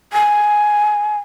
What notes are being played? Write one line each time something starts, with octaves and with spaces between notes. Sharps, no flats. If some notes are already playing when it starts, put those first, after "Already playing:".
G#5